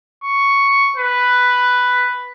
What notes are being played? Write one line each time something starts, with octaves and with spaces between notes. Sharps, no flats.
C#6
B4